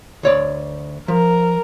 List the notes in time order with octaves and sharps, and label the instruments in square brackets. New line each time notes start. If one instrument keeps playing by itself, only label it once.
[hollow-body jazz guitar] D2 C#5 D5
[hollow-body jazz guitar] F3 [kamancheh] A#4